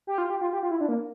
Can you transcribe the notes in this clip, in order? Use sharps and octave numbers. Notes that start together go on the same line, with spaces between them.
G4
F4
G4
F4
G4
F4
E4
D4
A#3